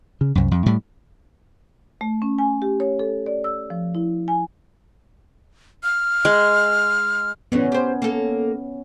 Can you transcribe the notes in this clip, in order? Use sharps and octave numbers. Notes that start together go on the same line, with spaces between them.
C#3
C2 F#2
F2
A2 G3
A3
C#4
G#5
G4
C#5
A4
D5
E6
F3
E4
G#5
F6
G#3
A2 D3 E3 B3 C#4
G4 C5
A#3 A4